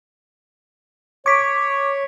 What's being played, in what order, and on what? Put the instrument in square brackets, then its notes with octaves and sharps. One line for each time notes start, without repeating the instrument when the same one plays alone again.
[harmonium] C#5 [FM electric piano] C#6 D6 [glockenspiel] G#6 B6 D7